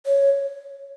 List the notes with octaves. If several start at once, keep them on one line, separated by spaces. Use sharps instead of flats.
C#5